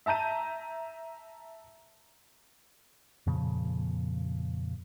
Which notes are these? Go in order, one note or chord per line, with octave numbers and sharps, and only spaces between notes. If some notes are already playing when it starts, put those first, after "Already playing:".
E5 A5 A#5 G6 D#7
F2 A#2 C#3 F3